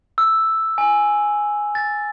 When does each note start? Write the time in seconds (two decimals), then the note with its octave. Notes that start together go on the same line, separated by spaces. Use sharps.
0.18 E6
0.78 G#5
1.75 A6